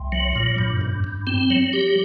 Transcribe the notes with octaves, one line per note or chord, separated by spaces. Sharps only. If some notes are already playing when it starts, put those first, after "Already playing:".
Already playing: C2
F#3
A#2
G2
G2
G2
C4
F#3
G4